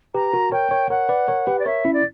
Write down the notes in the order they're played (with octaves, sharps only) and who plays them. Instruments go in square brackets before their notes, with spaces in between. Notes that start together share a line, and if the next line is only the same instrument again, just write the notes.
[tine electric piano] G4 B4 [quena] A#5
[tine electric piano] F#4 A#4
[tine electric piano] A#4 C#5 [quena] G5
[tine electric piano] A#4 C#5
[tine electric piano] A#4 C#5 [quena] F#5
[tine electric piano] B4 D5
A#4 C#5
G4 B4
[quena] D5
[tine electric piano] A#4 C#5 [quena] E5
[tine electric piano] C#4 E4
[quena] D5